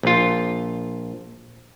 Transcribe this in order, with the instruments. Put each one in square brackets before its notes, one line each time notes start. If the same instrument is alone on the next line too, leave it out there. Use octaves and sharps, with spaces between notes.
[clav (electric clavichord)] A#1 F4